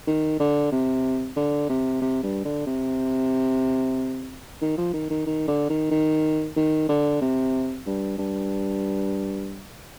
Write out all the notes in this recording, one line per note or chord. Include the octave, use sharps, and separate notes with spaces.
D#3
D3
C3
D3
C3
C3
G2
D3
C3
D#3
F3
D#3
D#3
D#3
D3
D#3
D#3
D#3
D3
C3
G2
G2